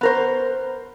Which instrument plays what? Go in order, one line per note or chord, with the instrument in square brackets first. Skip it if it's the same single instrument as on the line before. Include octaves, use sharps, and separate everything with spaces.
[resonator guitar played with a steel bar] B3 A#4 C5